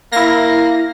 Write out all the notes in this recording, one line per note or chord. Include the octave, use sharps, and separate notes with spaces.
A#3 E4 A#6